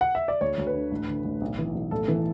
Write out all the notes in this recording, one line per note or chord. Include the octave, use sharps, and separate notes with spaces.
F#5
E5
D5
D2 C#5
D2
B4
D3
A1
D3
A1
B1
E3
B1
A1 A4
E3